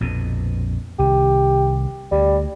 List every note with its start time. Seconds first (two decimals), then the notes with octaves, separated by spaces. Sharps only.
0.01 A#1 F2 B2
0.99 C2 D#3 G4
2.12 D2 G3